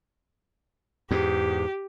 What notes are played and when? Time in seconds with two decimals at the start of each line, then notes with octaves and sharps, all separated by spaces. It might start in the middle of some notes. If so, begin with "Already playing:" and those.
1.11 E2 G#2 G4